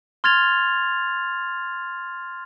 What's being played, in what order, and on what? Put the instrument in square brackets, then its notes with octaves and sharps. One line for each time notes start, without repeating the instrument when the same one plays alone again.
[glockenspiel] C6 F6 G#6 A6 F7